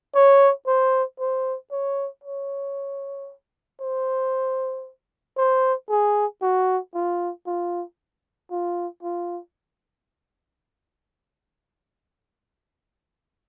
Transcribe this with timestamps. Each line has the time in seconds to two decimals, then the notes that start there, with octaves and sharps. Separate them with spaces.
0.15 C#5
0.67 C5
1.20 C5
1.72 C#5
2.24 C#5
3.81 C5
5.37 C5
5.90 G#4
6.42 F#4
6.94 F4
7.47 F4
8.51 F4
9.03 F4